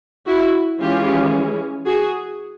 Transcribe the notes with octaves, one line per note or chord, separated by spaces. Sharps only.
E4 F#4
E3 G#3 C#4 F4 G4
F#4 G#4